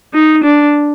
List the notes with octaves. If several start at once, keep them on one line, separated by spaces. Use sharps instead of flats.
D#4
D4